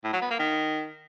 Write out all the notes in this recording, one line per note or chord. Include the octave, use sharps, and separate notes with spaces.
A2
F#3
B3
A#3
D#3